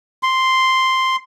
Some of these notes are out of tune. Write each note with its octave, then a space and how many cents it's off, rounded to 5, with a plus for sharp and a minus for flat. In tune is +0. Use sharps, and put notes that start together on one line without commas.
C6 +0